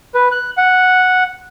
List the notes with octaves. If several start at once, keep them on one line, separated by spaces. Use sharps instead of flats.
B4
F#6
F#5